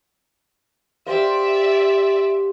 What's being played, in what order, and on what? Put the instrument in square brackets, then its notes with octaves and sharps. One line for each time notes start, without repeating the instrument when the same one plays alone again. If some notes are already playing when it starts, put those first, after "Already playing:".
[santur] G4 C5 F5 [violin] D5 E5